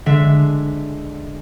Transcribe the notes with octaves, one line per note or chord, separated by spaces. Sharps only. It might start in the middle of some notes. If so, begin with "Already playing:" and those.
D3 G#3 E5